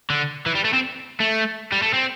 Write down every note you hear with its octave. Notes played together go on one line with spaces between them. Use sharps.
D3
E3
G3
A3
C4
A3
G3
A3
C4